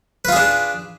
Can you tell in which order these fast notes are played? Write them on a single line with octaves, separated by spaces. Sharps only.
B4 F4 G#4 D4